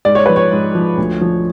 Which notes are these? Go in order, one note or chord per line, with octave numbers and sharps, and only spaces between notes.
G#2 D5
C#5
F3 B4
C#5
G#2
F3
D2
F3